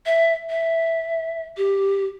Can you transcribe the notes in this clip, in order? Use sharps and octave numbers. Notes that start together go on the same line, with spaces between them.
E5
E5
G4